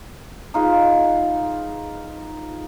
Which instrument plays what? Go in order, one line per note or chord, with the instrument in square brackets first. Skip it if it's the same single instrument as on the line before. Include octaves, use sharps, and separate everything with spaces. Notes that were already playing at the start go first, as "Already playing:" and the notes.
[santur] D#4 F4 G#4 B4